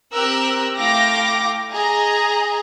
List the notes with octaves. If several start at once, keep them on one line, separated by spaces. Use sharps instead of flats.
C4 G4 A#4 E6 F#6
A3 E4 F5 G5 D6 A#6
G#4 D#5 A#5